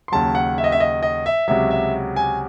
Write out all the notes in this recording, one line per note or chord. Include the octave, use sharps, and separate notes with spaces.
C6
D#2 C#3 F#3 A5
F#5
E5
D#5
E5
D#5
D#5
E5
C#2 C3 F#3 E5
E5
G#5